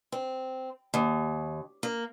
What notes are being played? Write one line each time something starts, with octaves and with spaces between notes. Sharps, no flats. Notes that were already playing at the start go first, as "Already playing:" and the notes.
C4
D#2
A#3